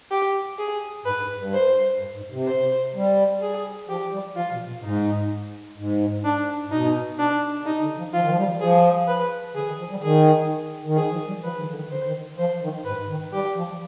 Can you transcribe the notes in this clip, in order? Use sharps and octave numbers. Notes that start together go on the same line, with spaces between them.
G4
G#4
G#2 B4
G2
G2
C5
G2
G#2
C3
C5
G3
G#4
F3 G4
G3
F3 F4
B2
B2
G#2 D#4
G#2
D4
G#2
B2 D#4
D4
D3
C3 D#4
D3
F3
F3 F4
D#3
F3
G3
F3 G#4
B4
D3 G#4
D#3
F3
G3
D#3 G#4
D#3
F3 G#4
F3
G3
F3 B4
D#3
D3
D#3
D3 C5
D#3
F3 C5
D#3
G#2 B4
D#3
G3 G4
F3